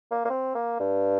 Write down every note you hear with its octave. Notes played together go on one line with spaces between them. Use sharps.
A#3
A#3
C4
A#3
G2